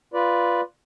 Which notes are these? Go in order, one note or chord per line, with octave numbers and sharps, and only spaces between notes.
F4 B4 D5